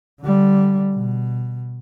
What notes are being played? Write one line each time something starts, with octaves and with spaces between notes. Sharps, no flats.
D3 G3
B2